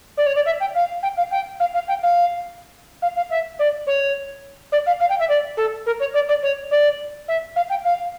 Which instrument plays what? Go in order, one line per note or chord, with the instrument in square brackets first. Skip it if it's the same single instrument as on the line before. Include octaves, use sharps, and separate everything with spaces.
[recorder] D5
C#5
D5
E5
G5
F5
G5
F5
G5
F5
F5
G5
F5
F5
F5
E5
D5
C#5
D5
F5
F5
G5
E5
D5
A4
A#4
C#5
D5
D5
C#5
D5
E5
F5
G5
F5